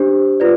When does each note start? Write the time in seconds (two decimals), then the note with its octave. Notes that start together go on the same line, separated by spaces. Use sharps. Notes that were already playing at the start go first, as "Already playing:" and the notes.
Already playing: D4 G4 C5
0.40 F4 B4 D5